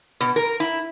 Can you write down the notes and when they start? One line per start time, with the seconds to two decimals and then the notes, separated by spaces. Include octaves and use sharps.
0.21 B2
0.36 A#4
0.60 E4